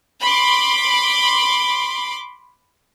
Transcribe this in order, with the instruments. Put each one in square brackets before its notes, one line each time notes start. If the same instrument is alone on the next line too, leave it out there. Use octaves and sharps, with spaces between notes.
[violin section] B5 C6 D6